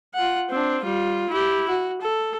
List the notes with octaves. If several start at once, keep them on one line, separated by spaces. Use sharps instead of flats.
F4 F#5
C4 D4
G3 F4
E4 G4
F#4
A4